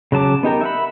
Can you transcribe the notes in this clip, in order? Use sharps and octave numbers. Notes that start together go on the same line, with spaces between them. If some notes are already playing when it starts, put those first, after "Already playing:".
C#3 F#3 A5 D6
B3 D#4 G4 A#4
E5 F#5 B5